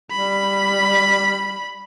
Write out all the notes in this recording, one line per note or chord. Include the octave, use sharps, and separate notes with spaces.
G3 B5